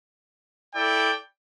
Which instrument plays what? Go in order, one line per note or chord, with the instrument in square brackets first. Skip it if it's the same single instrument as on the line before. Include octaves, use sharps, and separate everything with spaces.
[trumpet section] E4 A4 D5 G5